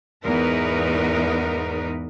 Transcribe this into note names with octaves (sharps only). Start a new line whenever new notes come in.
E2 G#2 B3 D#4 A#4 B4